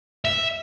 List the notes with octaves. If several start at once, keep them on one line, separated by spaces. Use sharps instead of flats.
E5